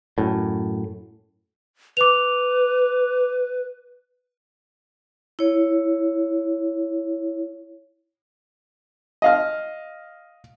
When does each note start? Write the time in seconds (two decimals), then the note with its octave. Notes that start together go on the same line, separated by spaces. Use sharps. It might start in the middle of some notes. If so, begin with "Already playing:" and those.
0.18 F#2 A2
1.97 B4 D6 F7
5.39 E4 C#5
9.22 D#5 F5 F6